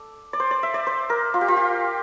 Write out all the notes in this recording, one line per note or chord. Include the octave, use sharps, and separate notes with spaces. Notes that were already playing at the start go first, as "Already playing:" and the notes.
Already playing: A4 D5
D5
C5
D5
E5
D5
C5
A#4
F4
G4
F4
G4